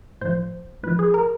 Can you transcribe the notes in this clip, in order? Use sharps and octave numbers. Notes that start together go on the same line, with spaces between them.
A2 F3 C5
A2 F3 B4
G#4
A#4